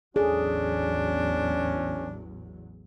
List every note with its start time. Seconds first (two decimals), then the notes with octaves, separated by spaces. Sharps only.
0.16 A1 E2 F#3 C#4 D4 G#4 A4